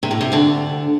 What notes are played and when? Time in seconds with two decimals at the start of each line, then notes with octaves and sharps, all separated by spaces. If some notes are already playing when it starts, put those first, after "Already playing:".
0.03 C3
0.11 A2
0.21 C3
0.32 D2 D3